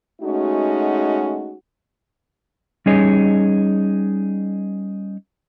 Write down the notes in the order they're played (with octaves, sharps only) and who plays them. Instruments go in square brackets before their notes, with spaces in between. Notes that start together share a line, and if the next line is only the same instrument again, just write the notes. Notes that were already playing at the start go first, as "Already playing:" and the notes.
[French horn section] G#3 A3 C#4 D#4 F#4
[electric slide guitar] G3 C#4 D#4 G#4 C#5 D#5